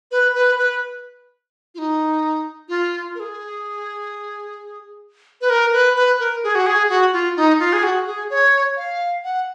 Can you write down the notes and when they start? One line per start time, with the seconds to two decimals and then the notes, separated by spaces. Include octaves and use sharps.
0.11 B4
0.35 B4
0.59 B4
1.75 F4
1.78 D#4
2.69 F4
3.15 A#4
3.20 G#4
5.41 B4
5.50 A#4
5.73 B4
5.96 B4
6.20 A#4
6.43 G#4
6.55 F#4
6.67 G#4
6.89 F#4
7.13 F4
7.37 D#4
7.59 F4
7.73 G#4
7.83 F#4
8.07 G#4
8.30 C#5
8.77 F5
9.24 F#5